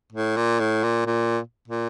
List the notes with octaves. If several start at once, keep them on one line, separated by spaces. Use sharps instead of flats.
A2
A#2
A2
A#2
A#2
A#2